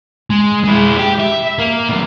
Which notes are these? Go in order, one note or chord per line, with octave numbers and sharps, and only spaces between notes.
G#3
G#3 E4
G4
E5
A#3
F#2 B2